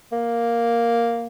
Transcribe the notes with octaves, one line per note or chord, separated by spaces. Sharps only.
A#3